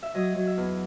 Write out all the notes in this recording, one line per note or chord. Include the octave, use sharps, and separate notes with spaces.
E5
F#3 D#5
F#3
E5
E2